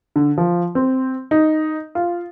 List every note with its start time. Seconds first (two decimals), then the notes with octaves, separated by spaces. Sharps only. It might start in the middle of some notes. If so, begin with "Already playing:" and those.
0.16 D3
0.38 F3
0.75 C4
1.31 D#4
1.95 F4